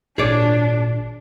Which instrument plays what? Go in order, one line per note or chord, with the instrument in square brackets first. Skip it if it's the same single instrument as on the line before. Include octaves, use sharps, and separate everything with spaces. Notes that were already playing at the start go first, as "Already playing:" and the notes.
[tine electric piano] G#1 A#2 [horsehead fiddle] D4 [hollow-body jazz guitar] G#4 C#5 D5